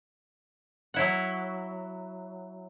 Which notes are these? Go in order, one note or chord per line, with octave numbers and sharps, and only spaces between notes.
F#3 E4 F#5